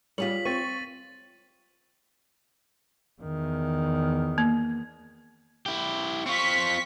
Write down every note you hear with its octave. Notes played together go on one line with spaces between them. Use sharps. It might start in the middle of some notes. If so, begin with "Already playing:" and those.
G3 F4 G#4 C#5 B6 F#7
C4 C#6 A6 D#7
E2 D#3
A#3
E4 G4
C4 F4 C#6 B6